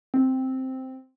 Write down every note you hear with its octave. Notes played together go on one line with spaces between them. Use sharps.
C4